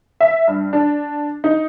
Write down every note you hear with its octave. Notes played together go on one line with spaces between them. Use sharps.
E5
G2
D4
D#4